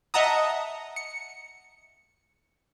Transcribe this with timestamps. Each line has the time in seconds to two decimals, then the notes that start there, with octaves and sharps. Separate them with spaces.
0.14 D#5 E5 F#5 A5 A#5 D#6
0.96 C#7